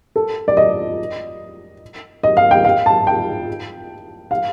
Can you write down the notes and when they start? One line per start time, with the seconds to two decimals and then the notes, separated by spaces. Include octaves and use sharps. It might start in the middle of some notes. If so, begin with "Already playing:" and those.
0.16 A4
0.48 D5
0.57 D#5
2.23 D#5
2.37 F5
2.51 G5
2.65 F5
2.86 A5
3.07 G5
4.31 F5